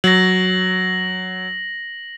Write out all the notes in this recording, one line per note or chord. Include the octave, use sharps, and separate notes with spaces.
F#3 A#6 F#7